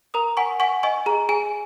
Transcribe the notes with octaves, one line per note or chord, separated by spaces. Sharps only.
A#4 A#5 D#6
F#5 G#5 C#6
F#5 G#5 C#6
D#5 G#5 C#6
G#4 A#5
G#4 G#5